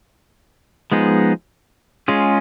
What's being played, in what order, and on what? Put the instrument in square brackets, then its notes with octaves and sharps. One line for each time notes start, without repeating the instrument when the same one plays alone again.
[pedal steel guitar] F3 G#3 B3 D#4 G#4
G#3 C#4 F4 G#4